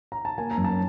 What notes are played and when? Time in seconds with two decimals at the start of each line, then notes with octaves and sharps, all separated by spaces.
0.12 A#5
0.25 A5
0.38 A#3 G#5
0.51 A#5
0.57 F#2
0.64 A5